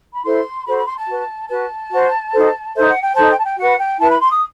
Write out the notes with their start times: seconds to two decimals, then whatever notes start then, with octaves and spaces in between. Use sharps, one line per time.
0.14 B5
0.24 E4 A4 C5 C6
0.65 F#4 A4 C5 B5
0.76 B5
0.87 C6
0.97 A5
1.07 F#4 B4
1.49 F#4 B4 A5
1.91 F#4 C5
2.33 D#4 F#4 A4 C5
2.74 D#4 A4 C5 E5
2.88 F#5
3.02 G5
3.15 D#4 A4 C5 A5
3.30 G5
3.38 A5
3.44 G5
3.57 F#4 B4 F#5
3.79 G5
3.99 E4 B4 A5
4.09 B5
4.20 C6
4.31 D#6